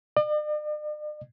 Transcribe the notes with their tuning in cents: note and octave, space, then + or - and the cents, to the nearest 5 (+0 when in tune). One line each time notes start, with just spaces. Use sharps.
D5 +45